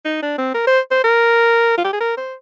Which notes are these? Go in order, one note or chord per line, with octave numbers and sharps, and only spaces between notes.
D#4
D4
C4
A#4
C5
C5
A#4
F4
G4
G#4
A#4
C5